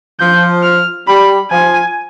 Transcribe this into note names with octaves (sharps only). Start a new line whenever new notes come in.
F3 G6
F6
G3 B5
F3 G#5